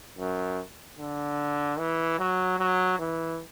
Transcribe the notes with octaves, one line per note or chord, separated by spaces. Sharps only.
F#2
D3
E3
F#3
F#3
E3